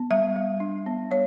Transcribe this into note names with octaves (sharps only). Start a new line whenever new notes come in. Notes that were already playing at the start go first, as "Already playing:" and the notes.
Already playing: B3
G3 E5
G3
D4
B3
G3 C#5